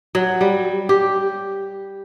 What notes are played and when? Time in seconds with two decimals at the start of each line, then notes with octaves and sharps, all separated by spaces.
0.15 F#3
0.41 G3
0.89 G4